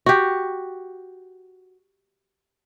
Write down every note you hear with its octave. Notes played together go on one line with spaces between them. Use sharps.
F#4 G4